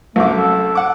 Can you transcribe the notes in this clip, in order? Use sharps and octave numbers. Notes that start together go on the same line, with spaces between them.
C2 F#2 A3 D6
A4
F#5 D6